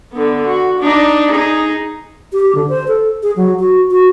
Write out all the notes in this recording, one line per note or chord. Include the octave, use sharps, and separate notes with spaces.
D3 B3
F#4
D4 D#4
D#4 G#4
G4
D3
C5
A4
G#4
F#3
F#4
F#4